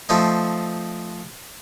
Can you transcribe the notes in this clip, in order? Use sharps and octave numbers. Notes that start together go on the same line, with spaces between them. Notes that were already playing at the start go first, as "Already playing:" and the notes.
F3 A3 C4 D#4